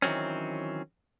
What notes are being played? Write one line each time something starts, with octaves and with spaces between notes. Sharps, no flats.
D#3 E3 F#3 C4 C#4